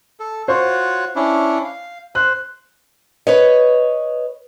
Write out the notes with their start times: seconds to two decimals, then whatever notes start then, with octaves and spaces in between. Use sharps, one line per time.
0.20 A4
0.48 F4 F#4 C5 C#5
1.16 C#4 D4 E4
1.64 F5
2.15 C5 F#6
3.27 B4 C#5 D#5